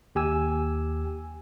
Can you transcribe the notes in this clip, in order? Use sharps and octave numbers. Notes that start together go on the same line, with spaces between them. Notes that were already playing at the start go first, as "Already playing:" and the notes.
D#2 G4 G#5 E6